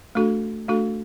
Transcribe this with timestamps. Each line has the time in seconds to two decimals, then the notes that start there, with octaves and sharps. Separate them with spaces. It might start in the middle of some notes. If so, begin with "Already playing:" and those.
0.15 A3 D4 F#4 A4
0.68 A3 D4 F#4 A4